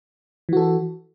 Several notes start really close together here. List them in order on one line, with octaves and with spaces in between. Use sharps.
E3 F#4 A4